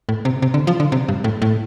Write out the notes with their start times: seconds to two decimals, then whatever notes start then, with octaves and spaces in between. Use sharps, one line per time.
0.09 A2
0.25 C3
0.42 C3
0.54 D3
0.67 F3
0.80 D3
0.92 C3
1.08 G2
1.24 A2
1.42 A2